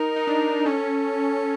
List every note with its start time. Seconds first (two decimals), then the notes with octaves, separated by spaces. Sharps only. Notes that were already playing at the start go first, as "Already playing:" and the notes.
Already playing: D#4 A#4
0.16 D#4
0.27 D4
0.66 C#4 A4